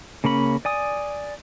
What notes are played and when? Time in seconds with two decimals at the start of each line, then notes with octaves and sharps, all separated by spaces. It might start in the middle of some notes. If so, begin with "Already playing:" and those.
0.24 C#3 A#3 C#4 B5
0.65 D5 G#5 D#6